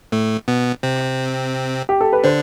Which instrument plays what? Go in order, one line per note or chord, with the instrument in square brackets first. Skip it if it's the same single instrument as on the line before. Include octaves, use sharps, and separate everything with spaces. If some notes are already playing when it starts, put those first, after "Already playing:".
[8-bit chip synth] A2 A3
B2 B3
C3 C4
[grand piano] G4
A4
B4
[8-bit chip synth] D3 D4 [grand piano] C5